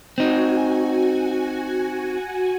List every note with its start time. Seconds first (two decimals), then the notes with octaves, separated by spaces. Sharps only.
0.18 C4 D#4 F#4 G#5